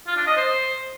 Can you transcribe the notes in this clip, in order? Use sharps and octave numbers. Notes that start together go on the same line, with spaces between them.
F4
D4
D#5
C5